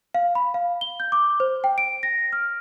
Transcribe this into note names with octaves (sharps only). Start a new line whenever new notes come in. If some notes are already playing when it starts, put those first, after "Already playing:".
F5
B5
F5
G7
G6
D6
C5
G5
D7
A#6
F6